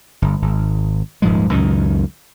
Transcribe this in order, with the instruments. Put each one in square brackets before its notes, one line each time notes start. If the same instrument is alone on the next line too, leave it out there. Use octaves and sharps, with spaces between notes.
[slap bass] G1
G#1
D#1 G#2 F3 G#3
C#2 F#2 A#2 D#3